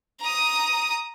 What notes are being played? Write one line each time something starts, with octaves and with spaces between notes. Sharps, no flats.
A#5 D#6